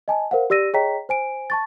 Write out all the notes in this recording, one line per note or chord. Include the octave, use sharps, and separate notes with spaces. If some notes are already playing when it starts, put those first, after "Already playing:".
D#5 G#5 A5
A#4 C5 F5 F#5
G4 D5 E6 A#6 D#7
G#4 C#5 D#5 G5 A#5 B6
C5 G#5 D7
A5 C#6 A6